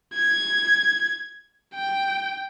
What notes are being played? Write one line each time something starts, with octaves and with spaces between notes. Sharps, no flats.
G#6
G5